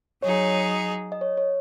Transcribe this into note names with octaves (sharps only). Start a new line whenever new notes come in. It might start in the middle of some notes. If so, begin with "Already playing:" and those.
F#3 D#4 G#4 C#5
D#5
C#5
C#5